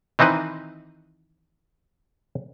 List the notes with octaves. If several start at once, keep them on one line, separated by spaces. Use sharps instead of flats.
D#3 E3 C4 D#4 B4